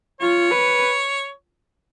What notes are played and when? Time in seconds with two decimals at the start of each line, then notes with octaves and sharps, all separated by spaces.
0.21 F4 C#5
0.51 B4